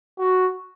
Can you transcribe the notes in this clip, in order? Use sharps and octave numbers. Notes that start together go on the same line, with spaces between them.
F#4